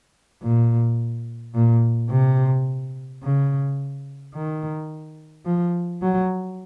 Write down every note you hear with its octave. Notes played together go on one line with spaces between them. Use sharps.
A#2
A#2
C3
C#3
D#3
F3
F#3